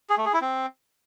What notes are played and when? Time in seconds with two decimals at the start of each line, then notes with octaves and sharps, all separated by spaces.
0.10 G#4
0.18 A3
0.26 G#4
0.34 E4
0.41 C4